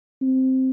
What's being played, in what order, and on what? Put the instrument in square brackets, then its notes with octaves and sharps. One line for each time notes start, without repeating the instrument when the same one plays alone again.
[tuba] C4